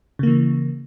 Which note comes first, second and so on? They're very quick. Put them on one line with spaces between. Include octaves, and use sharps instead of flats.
C#3 A#3 E3